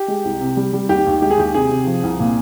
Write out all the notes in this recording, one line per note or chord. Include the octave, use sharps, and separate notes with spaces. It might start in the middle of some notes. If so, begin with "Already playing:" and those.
Already playing: G4
G#3
C2
C3
G3
G3
D#2 G4
D#2
G#3 G4
G#4
D#2 G4
C3 G#4
C3
F3
C2
A#2